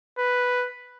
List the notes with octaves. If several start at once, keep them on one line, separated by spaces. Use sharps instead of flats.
B4